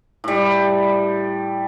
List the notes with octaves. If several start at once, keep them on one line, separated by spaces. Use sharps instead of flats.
A2 G3